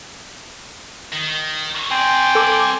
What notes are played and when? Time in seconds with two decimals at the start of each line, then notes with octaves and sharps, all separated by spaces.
1.12 D#3
1.91 C4 D5 G5 G#5 C6
2.35 A4 D6